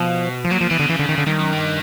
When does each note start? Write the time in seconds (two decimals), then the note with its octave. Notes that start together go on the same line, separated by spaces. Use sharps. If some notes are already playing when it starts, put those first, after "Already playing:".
Already playing: B2 F3
0.45 F3
0.51 A#2 F#3
0.61 F3
0.70 B2 E3
0.79 D3
0.89 C#3 E3
0.99 D3
1.09 D#3
1.18 D3
1.27 G2 D#3
1.39 F#2
1.53 G2